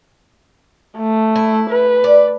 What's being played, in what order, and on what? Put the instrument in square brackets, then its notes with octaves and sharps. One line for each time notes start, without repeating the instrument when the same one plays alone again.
[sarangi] A3
[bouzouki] E4
[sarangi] B4
[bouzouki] D5